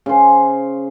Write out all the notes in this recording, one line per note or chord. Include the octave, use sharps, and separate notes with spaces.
C#3 C5